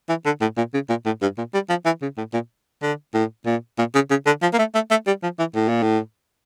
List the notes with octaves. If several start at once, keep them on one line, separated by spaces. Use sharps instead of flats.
E3
D3
A2
A#2
C#3
A#2
A2
G2
A#2
G3
F3
E3
C#3
A2
A#2
D3
A2
A#2
A#2
C#3
C#3
D3
F3
A#3
A3
A3
A3
G3
F3
E3
A2
A#2
A2